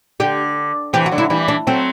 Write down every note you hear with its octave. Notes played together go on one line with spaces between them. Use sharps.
D3 G4
C3 E3 G4
F#4
D3 F#3
E4
E3 G3 E4
D4
F#3 A3 C4